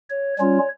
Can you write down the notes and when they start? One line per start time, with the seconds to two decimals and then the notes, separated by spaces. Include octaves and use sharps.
0.10 C#5
0.38 G3 C#4 F4 C#5